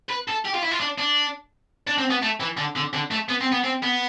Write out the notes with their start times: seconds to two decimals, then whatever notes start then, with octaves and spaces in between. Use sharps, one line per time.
0.09 B4
0.28 A4
0.45 G4
0.54 F4
0.63 E4
0.71 F4
0.80 D4
0.98 D4
1.87 D4
1.98 C4
2.10 B3
2.22 A3
2.40 E3
2.57 D3
2.76 D3
2.93 D3
3.11 A3
3.29 B3
3.41 C4
3.52 B3
3.64 C4
3.82 B3